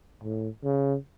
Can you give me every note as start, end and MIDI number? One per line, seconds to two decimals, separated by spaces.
0.24 0.48 45
0.63 0.96 49